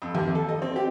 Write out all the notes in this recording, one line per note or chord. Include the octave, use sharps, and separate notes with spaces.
F2
D#2
A4
D#5
C4
G4